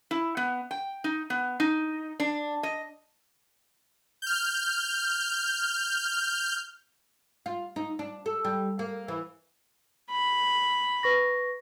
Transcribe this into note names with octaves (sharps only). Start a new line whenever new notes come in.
E4
B3
G5
D#4
B3
D#4
D4
D#5
F6 G6
F4
D#4
D4
A4
G3
A#3
E3
B5
B4 C#6 A#6